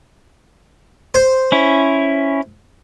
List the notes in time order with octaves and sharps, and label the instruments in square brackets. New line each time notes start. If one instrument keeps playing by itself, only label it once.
[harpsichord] C5
[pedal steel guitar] C#4 E4